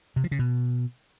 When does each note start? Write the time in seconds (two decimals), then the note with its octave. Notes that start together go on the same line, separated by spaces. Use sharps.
0.16 C3
0.24 F3
0.31 C#3
0.39 B2